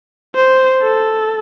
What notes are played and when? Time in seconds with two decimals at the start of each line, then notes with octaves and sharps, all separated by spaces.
0.35 C5
0.83 A4